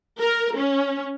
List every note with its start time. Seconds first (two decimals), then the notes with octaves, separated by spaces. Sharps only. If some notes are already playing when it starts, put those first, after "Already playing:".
0.20 A#4
0.56 C#4